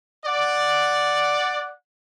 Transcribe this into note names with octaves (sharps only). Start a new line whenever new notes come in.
D5 F#5